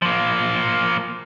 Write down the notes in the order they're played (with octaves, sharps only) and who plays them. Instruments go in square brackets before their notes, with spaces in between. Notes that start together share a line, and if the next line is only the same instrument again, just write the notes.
[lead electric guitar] F3 A#3